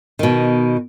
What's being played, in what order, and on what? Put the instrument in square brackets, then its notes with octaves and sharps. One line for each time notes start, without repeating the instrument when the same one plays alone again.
[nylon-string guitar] B2 D#3